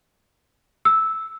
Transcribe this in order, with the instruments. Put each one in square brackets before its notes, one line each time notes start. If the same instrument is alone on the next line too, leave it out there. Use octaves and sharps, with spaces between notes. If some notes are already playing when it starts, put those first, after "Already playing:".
[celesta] E6